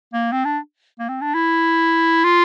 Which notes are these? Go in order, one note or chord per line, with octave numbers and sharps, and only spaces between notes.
A#3
C4
D4
A#3
C4
D4
E4
F4